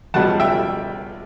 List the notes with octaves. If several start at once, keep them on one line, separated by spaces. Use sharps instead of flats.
C#2 B2 G3 F#5 A5
E5 G5